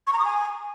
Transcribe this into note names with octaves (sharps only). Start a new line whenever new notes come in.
C#6
A#5
D#6
G#5